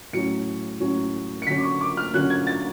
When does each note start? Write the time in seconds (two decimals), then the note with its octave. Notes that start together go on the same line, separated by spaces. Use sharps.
0.13 A2 F#3 C#4 C#7
0.80 A2 F#3 C#4
1.42 C#7
1.47 D3 F#3 C#4 B6
1.58 D6
1.63 C#6
1.81 D6
1.97 F6
2.14 D3 F#3 C#4 F#6
2.30 G#6
2.47 A6